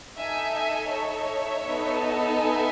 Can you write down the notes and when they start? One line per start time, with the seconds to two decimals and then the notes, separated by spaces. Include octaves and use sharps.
0.17 D#4 A4 E5 G#5
0.54 E5 G#5
0.91 C#5 E5
1.66 B3 D#4 A4
2.38 E5 G#5